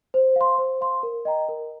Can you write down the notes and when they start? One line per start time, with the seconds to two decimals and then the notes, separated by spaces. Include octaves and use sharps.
0.14 C5
0.36 F5 C6
0.58 C5
0.81 F5 C6
1.03 A#4
1.25 D#5 G5 A#5
1.49 A#4